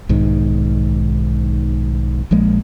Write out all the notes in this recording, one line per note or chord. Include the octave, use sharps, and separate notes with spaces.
B1 G#2 D#3
A#1 F3 G#3 A#3